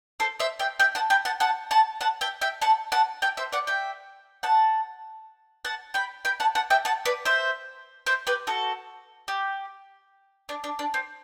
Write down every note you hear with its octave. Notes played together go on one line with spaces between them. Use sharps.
A4 C5
C5 E5
E5 G5
E5 G5
F#5 A5
G5 B5
F#5 A5
F#5 A5
F#5 A5
F#5 A5
E5 G5
E5 G5
F#5 A5
F#5 A5
E5 G5
C5 E5
D5 F#5
E5 G5
F#5 A5
F#5 A5
G5 B5
G5 B5
F#5 A5
F#5 A5
E5 G5
F#5 A5
B4 D5
C5 E5
C5 E5
G4 B4
F#4 A4
G4
D4
D4
D4
C4